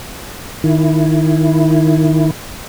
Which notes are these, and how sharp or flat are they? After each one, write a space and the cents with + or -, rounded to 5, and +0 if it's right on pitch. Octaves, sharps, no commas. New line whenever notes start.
D#3 +0 E4 +0